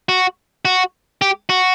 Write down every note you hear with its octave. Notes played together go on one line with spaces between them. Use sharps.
F#4
F#4
G4
F#4